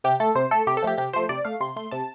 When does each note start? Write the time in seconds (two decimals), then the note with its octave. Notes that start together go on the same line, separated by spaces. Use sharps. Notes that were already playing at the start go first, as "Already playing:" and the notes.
0.04 C3 G4
0.20 A3 A4
0.35 C3 C5
0.51 A3 A4
0.67 C3 G4
0.77 A4
0.82 F3 A3 G4
0.98 C3 G4
1.13 F3 A3 C5
1.29 C3 D5
1.45 A3 F5
1.60 C3 C6
1.76 A3 C6
1.91 C3 A5